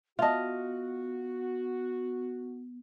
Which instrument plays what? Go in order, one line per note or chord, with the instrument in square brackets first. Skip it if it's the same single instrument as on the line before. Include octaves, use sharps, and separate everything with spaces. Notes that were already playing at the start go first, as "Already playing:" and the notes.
[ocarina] B3 [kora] F4 D#5 [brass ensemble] F#4 [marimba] E5 A5